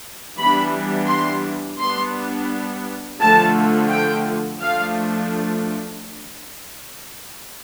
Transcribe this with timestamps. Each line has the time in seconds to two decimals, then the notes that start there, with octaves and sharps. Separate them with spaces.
0.38 E3 G3 B3 D4 B5
1.09 C6
1.79 G3 B3 D4 C6
3.20 D3 F3 A3 A5
3.91 G5
4.61 F3 A3 D4 F5